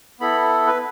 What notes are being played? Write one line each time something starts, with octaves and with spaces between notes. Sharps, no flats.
B3 E4 A4 B5
B4